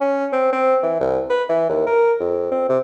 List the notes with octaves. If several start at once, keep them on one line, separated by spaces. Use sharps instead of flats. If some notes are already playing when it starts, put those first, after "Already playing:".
C#4
C4
C4
E3
C2
B4
E3
D#2
A#4
F2
C4
C3